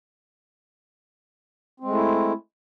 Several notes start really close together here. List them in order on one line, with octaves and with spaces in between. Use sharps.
C4 G#3 A3 E4